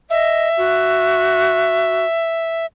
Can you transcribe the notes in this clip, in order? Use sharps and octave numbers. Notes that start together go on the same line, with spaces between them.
D#5 E5
F#4